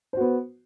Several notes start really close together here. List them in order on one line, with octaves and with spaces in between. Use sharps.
C5 F#4 B3